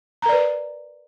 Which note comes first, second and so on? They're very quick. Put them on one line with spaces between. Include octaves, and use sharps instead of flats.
A#5 A#4 D5 B4